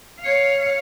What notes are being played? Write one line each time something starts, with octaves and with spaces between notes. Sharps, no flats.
C#5 F5